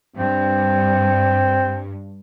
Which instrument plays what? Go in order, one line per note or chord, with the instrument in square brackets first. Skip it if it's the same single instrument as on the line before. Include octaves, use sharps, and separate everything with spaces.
[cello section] G2 [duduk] C4